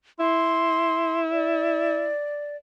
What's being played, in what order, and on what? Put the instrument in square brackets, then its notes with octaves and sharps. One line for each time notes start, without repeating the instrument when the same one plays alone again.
[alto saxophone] E4 [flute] C6
[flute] D5